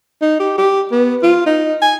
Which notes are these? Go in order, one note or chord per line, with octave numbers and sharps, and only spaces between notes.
D#4
G4
G4
B3
F4
D#4
G#5